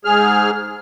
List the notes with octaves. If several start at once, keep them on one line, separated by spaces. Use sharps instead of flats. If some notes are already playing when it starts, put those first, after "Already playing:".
G#2 G#4 F6